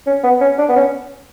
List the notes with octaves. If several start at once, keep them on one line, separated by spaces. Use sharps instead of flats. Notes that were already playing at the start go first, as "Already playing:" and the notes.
C#4
B3
C#4
D4
B3
C#4